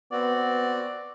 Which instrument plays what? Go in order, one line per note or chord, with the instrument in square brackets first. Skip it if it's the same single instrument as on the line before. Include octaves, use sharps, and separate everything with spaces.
[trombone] B3 [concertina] C4 F#4 [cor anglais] D5